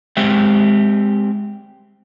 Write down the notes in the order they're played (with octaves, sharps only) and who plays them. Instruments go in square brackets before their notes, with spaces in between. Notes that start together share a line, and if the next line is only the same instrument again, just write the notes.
[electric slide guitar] G#3 C4 G4 E5